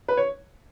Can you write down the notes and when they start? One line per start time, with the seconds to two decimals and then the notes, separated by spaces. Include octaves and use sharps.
0.08 B4
0.17 C#5